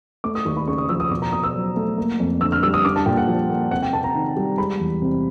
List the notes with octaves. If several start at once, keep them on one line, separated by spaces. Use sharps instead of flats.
A3 D6
D#6
D#2 C#6
B5
C#3 C#6
D#6
F3 E6
D#6
B2 D6
A#5
B2 D#6
E6
F#3
A3
A#3
F2
D3 E6
F6
G3 E6
D#6
D4 D6
A5
A#2 G5
F#5
F3
A#3
C3 F#5
G5
C3 A5
A#5
D#3
G3
G#3 B5
E2
C3